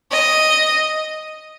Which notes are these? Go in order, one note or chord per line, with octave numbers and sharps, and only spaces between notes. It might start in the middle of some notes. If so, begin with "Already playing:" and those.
D#5